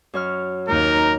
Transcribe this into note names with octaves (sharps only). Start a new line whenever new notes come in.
F#2 C#5 F6
D#2 D#4 A#4